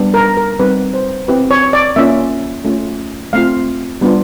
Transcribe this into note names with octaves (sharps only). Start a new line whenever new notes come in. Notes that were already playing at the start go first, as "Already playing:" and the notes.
Already playing: G3 B3 D4
A#4
A#4
G3 C4 D#4 B4
C5
C4 E4 G4 B4
C#5
D5
A#3 C#4 F4 E5
A3 C#4 F4
A3 C4 F4 F5
G3 B3 D4 F4